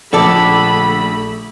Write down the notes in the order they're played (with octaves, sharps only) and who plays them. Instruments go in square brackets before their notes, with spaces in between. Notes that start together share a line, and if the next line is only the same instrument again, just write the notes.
[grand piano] A#1 [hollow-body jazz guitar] D3 A4 D5 [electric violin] A3 B5